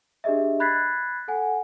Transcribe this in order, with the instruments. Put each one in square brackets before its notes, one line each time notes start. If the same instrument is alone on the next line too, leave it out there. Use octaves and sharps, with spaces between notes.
[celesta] D4 G4 G#4 D#5 E5
B5 F#6 G#6 A6 B6 C7
A4 F#5 G#5